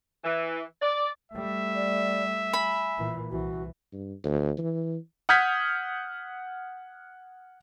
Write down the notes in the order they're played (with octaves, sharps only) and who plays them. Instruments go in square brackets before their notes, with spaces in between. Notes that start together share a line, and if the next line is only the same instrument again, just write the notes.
[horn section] E3
D5
[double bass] G3 A3 [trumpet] E5
[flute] D5
[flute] G#5 [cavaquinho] B5
[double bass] A#2 E3
[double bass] C2 E3 [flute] F#4
[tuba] G2
D2
E3
[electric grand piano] F#5 D#6 F6 G6 G#6 B6